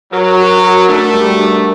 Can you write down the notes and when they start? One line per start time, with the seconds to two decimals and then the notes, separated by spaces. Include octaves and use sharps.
0.13 F#3 A#4
0.38 F#4
0.64 A#4
0.89 A3 D4
1.14 G3
1.40 D4